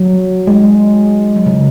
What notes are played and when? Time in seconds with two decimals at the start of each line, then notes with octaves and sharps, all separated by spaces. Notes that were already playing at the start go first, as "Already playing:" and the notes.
Already playing: F#3
0.47 G#3
1.36 F#3
1.46 C#3